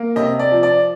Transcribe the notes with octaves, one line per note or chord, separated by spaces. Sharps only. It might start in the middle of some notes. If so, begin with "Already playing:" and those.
Already playing: A#3
C3 D#5
D5
F3
D5